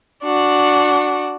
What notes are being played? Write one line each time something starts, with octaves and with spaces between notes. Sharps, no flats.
D4 F#4